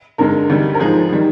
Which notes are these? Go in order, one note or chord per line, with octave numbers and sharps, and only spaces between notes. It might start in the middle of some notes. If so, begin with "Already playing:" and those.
G2 D3 G#3 A#4
D2 D3 G3
A#4
G#2 F3 G#3 G#4
D#3 G3